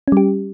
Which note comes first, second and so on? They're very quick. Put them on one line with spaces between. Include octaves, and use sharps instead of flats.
C#4 G3 G4